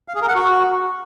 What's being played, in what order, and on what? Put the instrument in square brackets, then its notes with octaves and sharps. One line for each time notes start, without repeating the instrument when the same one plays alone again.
[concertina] F5
G#4
A#4
F#5
F#4